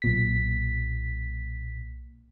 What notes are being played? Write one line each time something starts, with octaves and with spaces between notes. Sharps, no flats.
B1 A#2 B6